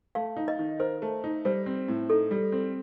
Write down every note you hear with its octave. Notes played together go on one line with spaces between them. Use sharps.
A3 F5
D#4
D#5
D#3
A#4 C5
A3
D#4
G3 C5
C4
A2
D#4 A4
G3
C4